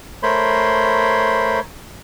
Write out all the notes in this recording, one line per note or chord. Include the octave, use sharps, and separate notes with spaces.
A3 A#4 C5 C#5 B5 C6